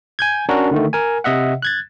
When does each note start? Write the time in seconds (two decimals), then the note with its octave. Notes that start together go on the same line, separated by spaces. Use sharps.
0.19 G#5 G6 G#6
0.49 C#4 D4 F#4 A#4 A#5
0.71 D3 D#3 A3
0.93 A#4 G#5
1.24 C3 D#5 E5 F#5
1.62 F#6 G#6 A6